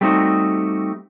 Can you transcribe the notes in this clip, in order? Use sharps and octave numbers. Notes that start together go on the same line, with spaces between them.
G3 A3 C4 D#4 F#4